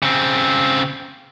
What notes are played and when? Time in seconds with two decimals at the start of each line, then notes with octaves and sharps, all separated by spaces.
0.03 C#3 C4